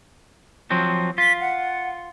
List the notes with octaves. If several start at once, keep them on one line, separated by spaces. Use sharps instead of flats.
F3 F#3 C4
F4 B6
F#5